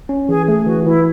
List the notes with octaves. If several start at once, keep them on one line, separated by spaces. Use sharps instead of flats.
C#4
E3 G#4
A3 G#4
E3 F#4
E3 E4